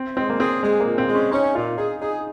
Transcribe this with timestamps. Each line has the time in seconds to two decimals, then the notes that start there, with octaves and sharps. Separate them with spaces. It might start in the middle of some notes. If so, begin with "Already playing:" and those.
Already playing: C4
0.17 G#3 C4
0.30 A#3
0.40 C4 G#4
0.63 G#3 G#4
0.80 A#3
0.85 A#2
0.98 C4
1.08 G#3
1.15 C#4
1.31 C#4 D#4
1.55 A#2 F4
1.78 D#4 G#4
2.01 D#4 G#4